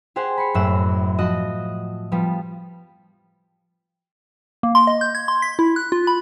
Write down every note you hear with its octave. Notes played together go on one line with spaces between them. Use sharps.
G4 G#4 C5 F#5 G#5
B5 C7 C#7
F#1 F#2 A2 E5 F#5 E7
F3 F#4 D#5
F3 G3 B3
A#3
C6
D#5
G6
G#6
C6
B6
E4
F#6
F4
B5